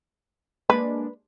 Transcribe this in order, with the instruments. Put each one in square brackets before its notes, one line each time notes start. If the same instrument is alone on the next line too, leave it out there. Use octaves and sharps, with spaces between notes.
[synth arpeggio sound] G#3 A#3 D4 [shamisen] B4